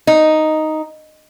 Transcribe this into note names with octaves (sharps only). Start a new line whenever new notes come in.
D#4